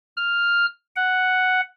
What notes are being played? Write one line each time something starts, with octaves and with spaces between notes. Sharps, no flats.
F6
F#5